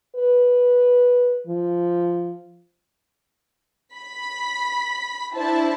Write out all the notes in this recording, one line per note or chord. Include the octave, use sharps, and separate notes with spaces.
B4
F3
B5 B6
D4 E4 C5 A5